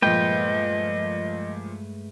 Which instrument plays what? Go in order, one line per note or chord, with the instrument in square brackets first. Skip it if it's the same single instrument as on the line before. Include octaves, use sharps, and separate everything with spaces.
[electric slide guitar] G2 G#3 A3 [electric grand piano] A#2 F3 [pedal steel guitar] B4 G5 [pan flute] D#5